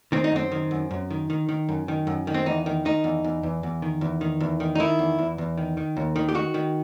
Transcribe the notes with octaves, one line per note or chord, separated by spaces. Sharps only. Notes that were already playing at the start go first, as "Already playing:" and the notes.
D#3 C4
D#4
F#2 C4
D#3
F#2
F#2
D#3
D#3
D#3
F#2
D#3
F#2
D#3
C4
E2 D#4
D#3
D#3 D#4
E2
E2
E2
E2
D#3
E2
D#3
E2
D#3
D#4
D#3 E4
E2
E2
E2
D#3
D#3
D#2
D#3
G4
D#3 F#4
D#3